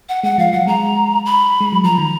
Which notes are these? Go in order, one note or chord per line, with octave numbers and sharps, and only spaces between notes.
F#5
G#3 F#5
F3 F5
F#3 F#5
G#3 A#5
B5
G#3
F#3
F3 A#5
D#3